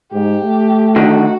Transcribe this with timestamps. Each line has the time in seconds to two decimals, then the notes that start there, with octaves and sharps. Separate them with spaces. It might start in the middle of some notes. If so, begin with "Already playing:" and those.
0.13 G#2 G4
0.44 A3
0.96 D3 D#3 F#4